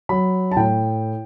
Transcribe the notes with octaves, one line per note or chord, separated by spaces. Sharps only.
F#3 B5
A5
A2 G5